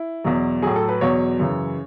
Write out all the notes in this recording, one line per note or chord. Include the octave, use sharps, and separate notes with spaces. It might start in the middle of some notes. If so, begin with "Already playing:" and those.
Already playing: E4
E2 B2 F#3
A2 F#3 G#4
A4
B4
E2 B2 F#3 C#5
F#2 C#3 E3